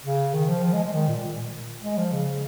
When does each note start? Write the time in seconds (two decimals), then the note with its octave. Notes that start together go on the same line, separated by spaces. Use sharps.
0.04 C#3
0.34 D#3
0.49 F3
0.64 F3
0.73 G#3
0.84 G#3
0.93 D#3
1.08 A#2
1.83 G#3
1.98 F3
2.13 C#3